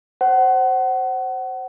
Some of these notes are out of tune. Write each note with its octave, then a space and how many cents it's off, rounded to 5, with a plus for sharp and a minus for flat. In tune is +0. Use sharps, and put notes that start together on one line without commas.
C5 +10 F#5 +30